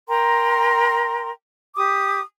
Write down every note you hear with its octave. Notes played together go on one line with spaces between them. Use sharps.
A#4 G5 A#5 C6
G4 D6 D#6